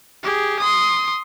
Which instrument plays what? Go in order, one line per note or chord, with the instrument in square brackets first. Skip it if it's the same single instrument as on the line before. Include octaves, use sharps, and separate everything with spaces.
[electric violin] G4 G#4
C6 D#6